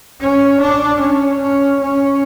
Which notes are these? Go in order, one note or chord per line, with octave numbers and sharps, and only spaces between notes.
C#4
D4
C#4
C#4
C#4